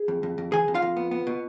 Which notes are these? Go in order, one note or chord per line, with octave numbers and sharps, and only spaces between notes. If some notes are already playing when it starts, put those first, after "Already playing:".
Already playing: G#4
F2
F2
F2
E3 G#4 G#5
F2
F4 F5
F2
B3
B3
B2